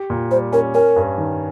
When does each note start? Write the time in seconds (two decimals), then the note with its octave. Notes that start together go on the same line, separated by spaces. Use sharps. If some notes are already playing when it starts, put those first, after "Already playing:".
Already playing: G4
0.10 A#2
0.31 G3 C5
0.52 C#4 A#4
0.74 C#4 A#4
0.96 G2
1.18 D#3